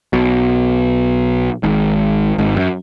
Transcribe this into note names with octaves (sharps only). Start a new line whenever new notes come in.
B1 B2
G#1 G#2
G#1 G#2
F#2